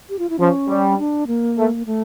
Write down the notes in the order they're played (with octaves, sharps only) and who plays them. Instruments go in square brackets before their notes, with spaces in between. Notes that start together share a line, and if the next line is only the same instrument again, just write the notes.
[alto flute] G4
F4
E4
[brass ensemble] F3 [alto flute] C#4
[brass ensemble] G3
[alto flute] D4
A#3
[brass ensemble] A3
[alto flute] A3